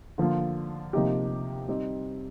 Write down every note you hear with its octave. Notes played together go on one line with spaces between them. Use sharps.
D3 F3 A#3 F4
C3 F3 A#3 D#4 G4
G3 C4 D#4